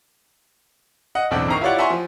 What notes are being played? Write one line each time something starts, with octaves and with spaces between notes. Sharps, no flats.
D#5 F#5
B1 E2 A2 C4 D4
G#1 D#3 A#5 C#6 C7
E4 F4 G4 C#5 D5 F#5
E5 F#5 G#5 A#5 C6 C#6
F3